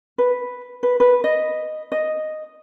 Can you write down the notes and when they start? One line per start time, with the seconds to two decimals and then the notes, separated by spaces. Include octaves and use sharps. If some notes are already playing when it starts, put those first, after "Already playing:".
0.18 B4
0.83 B4
1.00 B4
1.24 D#5
1.92 D#5